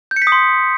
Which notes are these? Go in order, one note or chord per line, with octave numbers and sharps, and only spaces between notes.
G6
C#7
B6
D#6
C6